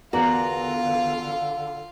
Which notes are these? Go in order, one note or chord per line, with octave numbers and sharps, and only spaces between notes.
E2 D3 F4 F#4 A#4 D5 F5